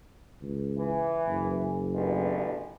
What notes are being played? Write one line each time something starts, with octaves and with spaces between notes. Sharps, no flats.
C#2
E3
F#1
A1 G2 B2